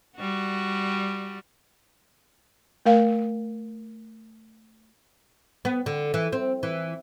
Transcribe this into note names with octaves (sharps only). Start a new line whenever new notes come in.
G3 F#4
A3 A#4 F5
B3
D3
E3
C4
E3